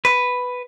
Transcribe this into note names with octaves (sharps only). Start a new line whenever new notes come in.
B4